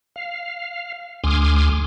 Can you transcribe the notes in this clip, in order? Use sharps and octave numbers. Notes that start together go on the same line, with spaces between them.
F5
D2 G#5 C6 D6 D#6 F6